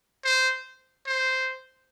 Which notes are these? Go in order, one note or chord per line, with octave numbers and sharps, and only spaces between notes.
C5
C5